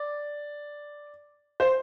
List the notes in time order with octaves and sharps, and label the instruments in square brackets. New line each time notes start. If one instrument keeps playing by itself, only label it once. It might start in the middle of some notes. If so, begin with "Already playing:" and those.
Already playing: [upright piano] D5
C5